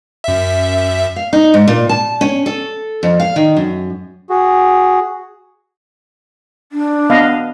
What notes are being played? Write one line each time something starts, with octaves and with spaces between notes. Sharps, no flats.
F#2 E5
F5
D#4
G#2
A#2
A5
C#4
A4
F2
F5
D#3
F#2
F#4 G#4
D4
B3 D#5 F5